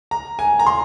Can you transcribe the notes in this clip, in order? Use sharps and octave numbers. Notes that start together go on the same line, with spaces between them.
A#5
G#5
A#5
C6